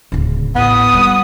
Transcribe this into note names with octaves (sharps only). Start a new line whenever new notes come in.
D1 C#3
A1 B3 D#6
G3